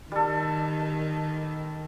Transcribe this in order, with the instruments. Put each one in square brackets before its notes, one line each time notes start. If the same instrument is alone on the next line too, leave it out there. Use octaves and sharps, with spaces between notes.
[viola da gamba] D#3 [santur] G3 A4
[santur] A5